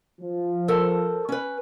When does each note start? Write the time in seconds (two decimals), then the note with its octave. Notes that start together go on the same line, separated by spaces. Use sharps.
0.21 F3
0.68 A4 A#4 C5
1.29 C#4 B4